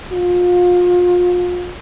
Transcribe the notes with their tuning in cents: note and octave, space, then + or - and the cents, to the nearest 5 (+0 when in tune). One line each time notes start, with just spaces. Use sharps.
F4 +35